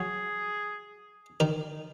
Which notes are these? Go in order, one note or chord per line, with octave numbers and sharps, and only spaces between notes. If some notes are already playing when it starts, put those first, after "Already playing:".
Already playing: F#3 F#4 G#4
D#3 D#4